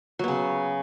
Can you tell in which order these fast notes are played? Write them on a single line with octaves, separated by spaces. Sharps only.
F#3 B3 C#3